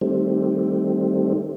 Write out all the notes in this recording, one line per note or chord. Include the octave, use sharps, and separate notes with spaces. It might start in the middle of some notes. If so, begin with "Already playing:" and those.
D#3 G3 A3 C4